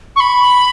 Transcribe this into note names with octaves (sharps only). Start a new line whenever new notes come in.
C#6
B5